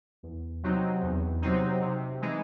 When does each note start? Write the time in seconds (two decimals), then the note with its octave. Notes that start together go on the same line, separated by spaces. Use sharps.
0.23 E2
0.63 C3 F#3 C4 D#4
1.03 E2
1.42 C3 F#3 C4 D#4
1.82 C3
2.22 E3 G#3 D#4